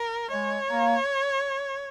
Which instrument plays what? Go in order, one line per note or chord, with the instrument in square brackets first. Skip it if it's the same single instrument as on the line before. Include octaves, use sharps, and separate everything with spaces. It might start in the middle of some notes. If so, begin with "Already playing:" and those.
Already playing: [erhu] A#4
[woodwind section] G#3 [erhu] C#5
[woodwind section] A#3